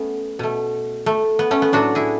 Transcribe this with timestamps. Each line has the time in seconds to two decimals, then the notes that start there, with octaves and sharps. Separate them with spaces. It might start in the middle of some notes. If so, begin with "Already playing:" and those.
Already playing: A3 B3 C#4
0.39 B2 A3
1.06 A3
1.39 B3
1.51 A3 C#4
1.62 B3
1.72 A2 F#3 A3 D4 F#4
1.95 E4 G#4